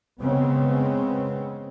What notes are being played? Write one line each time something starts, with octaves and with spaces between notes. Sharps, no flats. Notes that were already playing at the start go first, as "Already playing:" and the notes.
C#3 G#3 B3 C4